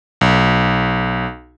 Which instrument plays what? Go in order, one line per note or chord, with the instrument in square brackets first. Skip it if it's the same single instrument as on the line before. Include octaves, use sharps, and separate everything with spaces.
[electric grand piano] B1